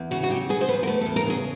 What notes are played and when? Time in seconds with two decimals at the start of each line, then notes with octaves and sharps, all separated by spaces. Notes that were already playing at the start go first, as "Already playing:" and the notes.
Already playing: E2
0.11 C#3 F#4
0.23 F#4
0.30 F#3 G4
0.49 B3 G#4
0.61 C5
0.68 E2 B4
0.83 A#4
0.87 A3 B4
1.01 A4
1.06 E2
1.16 A#4
1.26 C#3 G#4